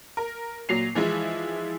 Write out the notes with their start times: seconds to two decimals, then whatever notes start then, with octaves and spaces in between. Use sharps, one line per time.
0.17 A#4
0.69 A#2 F#3 C7 F7
0.95 E3 F3 G#3 E4